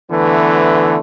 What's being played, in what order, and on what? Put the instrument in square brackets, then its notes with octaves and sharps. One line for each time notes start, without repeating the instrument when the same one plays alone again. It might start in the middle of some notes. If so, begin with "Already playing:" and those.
[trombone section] D3 E3 A3 B3